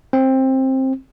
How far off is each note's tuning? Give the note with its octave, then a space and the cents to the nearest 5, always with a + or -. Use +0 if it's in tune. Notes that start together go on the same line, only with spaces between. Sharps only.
C4 +15